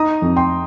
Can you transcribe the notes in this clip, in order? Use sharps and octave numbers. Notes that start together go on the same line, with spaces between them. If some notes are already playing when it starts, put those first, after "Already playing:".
Already playing: D#4 A#5 D#6
F2
G5 C6